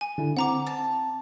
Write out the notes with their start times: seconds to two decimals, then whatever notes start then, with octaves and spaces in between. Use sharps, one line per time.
0.01 G#5
0.18 D3 E4
0.37 C4 F#5 A#5 D6
0.67 A5